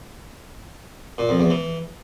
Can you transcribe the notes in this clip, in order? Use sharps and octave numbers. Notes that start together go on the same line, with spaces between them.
A#2
F2
E2
E3